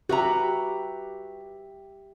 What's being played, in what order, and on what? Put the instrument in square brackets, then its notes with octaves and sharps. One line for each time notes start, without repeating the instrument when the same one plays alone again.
[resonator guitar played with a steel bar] F#4 B4 A#5 [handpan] G4 E5